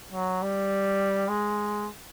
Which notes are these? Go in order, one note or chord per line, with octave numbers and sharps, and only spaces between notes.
F#3
G3
G#3